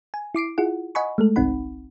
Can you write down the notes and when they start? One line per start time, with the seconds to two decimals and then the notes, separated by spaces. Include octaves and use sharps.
0.14 G#5
0.35 E4 D6 C7 D7
0.58 E4 F4 G#4 F#5
0.95 D#5 F#5 G#5 B5 C#6
1.18 G#3 A3 A4
1.36 G1 C2 C4 D#4 F#5 B5